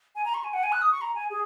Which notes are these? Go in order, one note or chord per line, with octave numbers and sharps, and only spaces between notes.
G#5
A#5
C#6
G#5
F#5
G#5
F#6
D#6
C#6
A#5
G#5
G#4